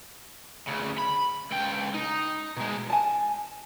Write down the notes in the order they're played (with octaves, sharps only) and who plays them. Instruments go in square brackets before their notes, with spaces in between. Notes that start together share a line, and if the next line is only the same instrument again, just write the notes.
[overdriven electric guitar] D2 C#3
B5
C#2 G5
D#4
B2 G#3
[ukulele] G#5 A5